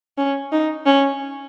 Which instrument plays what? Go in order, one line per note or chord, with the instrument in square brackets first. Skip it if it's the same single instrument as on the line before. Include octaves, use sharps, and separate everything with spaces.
[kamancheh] C#4
D#4
C#4